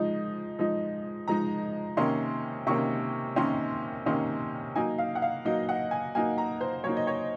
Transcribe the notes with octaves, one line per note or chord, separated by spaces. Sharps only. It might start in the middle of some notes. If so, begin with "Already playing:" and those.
Already playing: F3 G#3 D#4
F3 G#3 D#4
F3 G#3 D#4 A#5
C3 D#3 A#3 C#4 C6
C3 D#3 A#3 C#4 C#6
C3 D#3 A#3 C#4 C6
C3 D#3 A#3 C#4 C6
F#3 A#3 D#4 G#5
F5
F#5
F5
F#3 A#3 D#4 D#5
F#5
G#5
F#3 A#3 D#4 G#5
A#5
C5
F#3 A#3 D#4 C#5
D#5
C#5